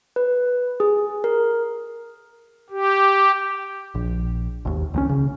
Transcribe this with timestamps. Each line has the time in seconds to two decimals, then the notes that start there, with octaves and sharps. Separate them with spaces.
0.16 B4
0.80 G#4
1.24 A#4
2.70 G4
3.95 A#1
4.65 G#1 D#2
4.94 C#2 F#3 C#4
5.09 C#3